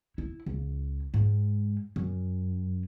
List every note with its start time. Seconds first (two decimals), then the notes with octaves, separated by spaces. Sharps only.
0.18 E4
0.46 C#2
1.14 G#2
1.96 F#2